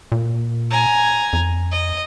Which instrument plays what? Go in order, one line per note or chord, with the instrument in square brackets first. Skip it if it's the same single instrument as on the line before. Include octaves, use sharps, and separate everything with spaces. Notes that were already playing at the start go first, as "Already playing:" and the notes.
[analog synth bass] A#2
[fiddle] G#5 A#5
[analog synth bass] F2
[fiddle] D#5